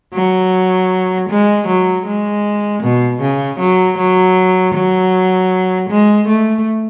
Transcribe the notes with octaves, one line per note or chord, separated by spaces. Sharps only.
F#3
G#3
F#3
G#3
B2
C#3
F#3
F#3
F#3
G#3
A3